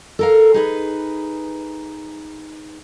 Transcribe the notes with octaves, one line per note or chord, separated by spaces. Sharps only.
A4 A#4 F5
D#4 G#4 B4